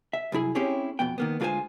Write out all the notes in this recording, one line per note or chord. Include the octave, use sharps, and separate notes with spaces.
E5
C2 F#2 E4 G#4
C4 C#4 E4 G4 G#4 C#5
F2 B2 B3 G5
D#3 A#3 B3
D2 G#3 F4 A#4 C5 G#5